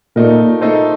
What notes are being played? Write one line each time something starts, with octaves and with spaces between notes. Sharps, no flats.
A#2 A3 D#4 A#4
A3 D#4 A4 C5